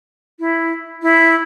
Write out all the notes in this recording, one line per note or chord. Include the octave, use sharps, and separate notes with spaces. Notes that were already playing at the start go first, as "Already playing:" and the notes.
E4
E4